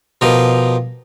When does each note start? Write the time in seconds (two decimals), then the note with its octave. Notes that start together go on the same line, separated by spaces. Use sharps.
0.21 B2 F3 G4 A#4 D#5